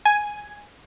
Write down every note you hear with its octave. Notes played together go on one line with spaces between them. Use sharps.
G#5